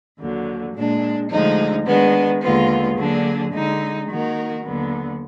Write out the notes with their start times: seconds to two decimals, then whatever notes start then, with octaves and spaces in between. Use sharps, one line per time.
0.18 D#2 D3 F#3
0.74 A#2 G#3 D4
1.30 D2 D3 F3 G#3 D#4
1.85 D#3 G#3 B3 D4
2.41 D#2 D3 G#3 B3 F4
2.96 D3 F#3 A#3 D4 G#4
3.52 D3 G#3 D#4
4.08 D#3 A#3 D#4 F#4 A#4
4.63 D#2 D3 F#3 B3